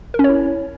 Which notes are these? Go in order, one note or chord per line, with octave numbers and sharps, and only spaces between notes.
A#4
C#4
C#5
E4